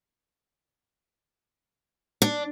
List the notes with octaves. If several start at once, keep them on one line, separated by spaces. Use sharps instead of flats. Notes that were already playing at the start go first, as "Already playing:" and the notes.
D4